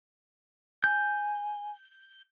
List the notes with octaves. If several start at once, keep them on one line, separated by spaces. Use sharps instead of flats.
G#5 G6